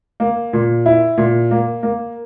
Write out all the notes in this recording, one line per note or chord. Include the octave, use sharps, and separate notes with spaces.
A#3
A#2
E4
A#2
A#3
A#3